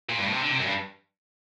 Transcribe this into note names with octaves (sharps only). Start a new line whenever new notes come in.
A#2
G2
A2
C3
D3
C3
F#2
G2